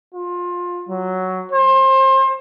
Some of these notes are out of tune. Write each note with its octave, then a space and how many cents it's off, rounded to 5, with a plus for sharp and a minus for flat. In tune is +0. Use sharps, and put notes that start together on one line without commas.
F4 +20
F#3 +5
C5 +30